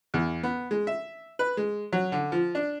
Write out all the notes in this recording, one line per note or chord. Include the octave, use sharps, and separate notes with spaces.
E2
B3
G#3
E5
B4
G#3
F#3
D3
F3
D4